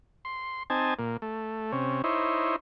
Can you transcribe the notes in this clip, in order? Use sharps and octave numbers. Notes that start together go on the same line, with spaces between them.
C6
C4 D#4 G#5 A5
A#2
A3
C3 C#4
D#4 E4 C5 C#5